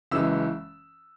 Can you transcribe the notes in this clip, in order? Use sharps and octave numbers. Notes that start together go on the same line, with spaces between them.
F#1 F#2 E3 G#3 E6